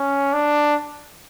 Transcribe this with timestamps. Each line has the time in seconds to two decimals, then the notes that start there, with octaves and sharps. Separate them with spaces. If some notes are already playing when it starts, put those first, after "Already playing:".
Already playing: C#4
0.33 D4